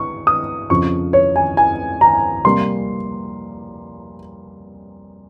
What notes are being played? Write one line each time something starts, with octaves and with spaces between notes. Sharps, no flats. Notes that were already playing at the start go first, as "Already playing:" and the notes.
Already playing: C#6
D#6
F2 C#3 F3 C#6
C#5
G#5
G#5
A#5
C3 G3 A#3 C6